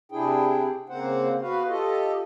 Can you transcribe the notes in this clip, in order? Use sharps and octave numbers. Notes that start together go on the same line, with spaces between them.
C3 D4 E4 G#4 G5
C#3 A#3 C4 C5 F#5
B3 F#4 B4 F5
F4 G4 A4 D#5